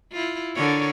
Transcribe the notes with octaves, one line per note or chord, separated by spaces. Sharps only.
E4 F4
D3 A#4 C#5